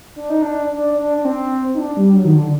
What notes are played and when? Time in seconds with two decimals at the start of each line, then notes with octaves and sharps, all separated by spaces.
0.16 D4
0.30 D#4
0.42 D4
0.71 D4
0.98 D4
1.18 D4
1.25 C4
1.75 D#4
1.78 D4
1.97 G3
2.15 F#3
2.25 D#3
2.35 D3